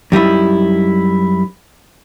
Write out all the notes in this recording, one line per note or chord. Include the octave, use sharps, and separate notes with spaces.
F#2 G3 D#4 E4